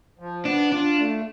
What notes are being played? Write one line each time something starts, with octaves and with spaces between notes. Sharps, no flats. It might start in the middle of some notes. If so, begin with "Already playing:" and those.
F3
B3 D4
D4 F4
A3